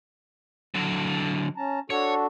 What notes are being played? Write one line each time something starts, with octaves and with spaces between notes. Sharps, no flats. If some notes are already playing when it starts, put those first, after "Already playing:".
D3 F#3
C#4 A5 A#5
D4 F#4 A4 C#5